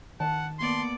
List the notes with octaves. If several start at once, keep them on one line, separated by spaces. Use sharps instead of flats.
D#3 F#5 A5
A#3 B3 D5 C6